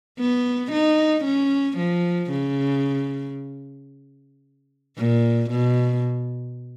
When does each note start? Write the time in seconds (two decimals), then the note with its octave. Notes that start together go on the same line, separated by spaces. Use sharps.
0.19 B3
0.72 D#4
1.25 C#4
1.78 F3
2.31 C#3
4.97 A#2
5.50 B2